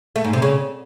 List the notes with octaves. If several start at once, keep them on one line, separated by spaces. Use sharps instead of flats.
A3
G#2
C3
C#3